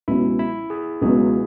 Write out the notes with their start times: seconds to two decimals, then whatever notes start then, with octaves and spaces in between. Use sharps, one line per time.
0.08 C#2 B2 F#3 C#4 E4
0.39 E4
0.70 G#4
1.01 C#2 B2 F#3 C#4 G#4